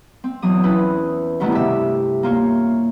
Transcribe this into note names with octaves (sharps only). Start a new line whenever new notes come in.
C4
E2 E3 F#3 D#6
C4 C#4 E4 B4
G2 B2 D#3 A3 B3 E4
C3 E5
A#3 F4 C#5